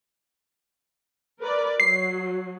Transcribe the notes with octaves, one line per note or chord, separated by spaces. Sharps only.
A#4 B4 D5
F#3 C7